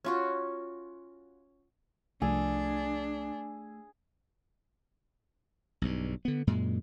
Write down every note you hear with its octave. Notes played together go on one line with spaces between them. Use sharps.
C#4 F4 F#4
C2 F3 A3 D4 G#4
B1 G2
D3 B3
F#2 A#2 G#3